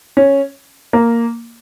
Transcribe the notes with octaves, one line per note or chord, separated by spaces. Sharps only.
C#4
A#3